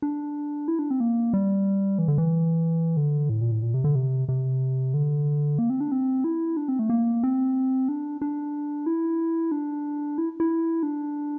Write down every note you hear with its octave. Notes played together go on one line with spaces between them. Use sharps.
D4
E4
D4
C4
A#3
G3
E3
D3
E3
D3
A2
A#2
A2
A#2
C3
D3
C3
C3
D3
A#3
C4
D4
C4
E4
D4
C4
A3
A#3
C4
D4
D4
E4
D4
E4
E4
D4